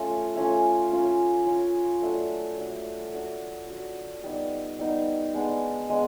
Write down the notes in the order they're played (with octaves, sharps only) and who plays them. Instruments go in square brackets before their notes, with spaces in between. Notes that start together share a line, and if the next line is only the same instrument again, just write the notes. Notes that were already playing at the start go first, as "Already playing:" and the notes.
Already playing: [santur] A3 C#4 F4
A3 C#4 F4
C#4 F4 A#4
C#4 F4 A#4
F#3 A3 D4
F#3 A3 D4
D4 F#4 A#4
D4 F#4 A#4
G3 B3 D#4
G3 B3 D#4
G#3 B3 D4
G#3 B3 D4